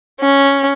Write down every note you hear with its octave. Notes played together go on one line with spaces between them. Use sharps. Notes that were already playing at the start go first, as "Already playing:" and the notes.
C#4